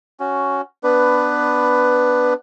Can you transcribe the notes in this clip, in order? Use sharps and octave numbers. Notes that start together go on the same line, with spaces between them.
C#4 F#4
B3 D4 B4